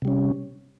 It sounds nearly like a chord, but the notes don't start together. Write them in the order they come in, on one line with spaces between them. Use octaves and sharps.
C3 G3 C#4